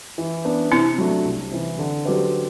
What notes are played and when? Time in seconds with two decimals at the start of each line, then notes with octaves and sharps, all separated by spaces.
0.18 E3
0.45 B3 D4
0.72 C3 C4 E4
0.98 F#3 A3 D4
1.25 C2
1.51 C3 E3
1.79 D3
2.05 F#3 C4 G4 B4